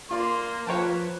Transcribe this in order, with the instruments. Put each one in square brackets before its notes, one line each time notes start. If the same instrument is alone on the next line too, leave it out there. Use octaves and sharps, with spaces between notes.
[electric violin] A#3 [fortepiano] F4 D5 [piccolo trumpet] C6
[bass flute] F3 [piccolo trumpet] B4 [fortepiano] C#5 G5 A5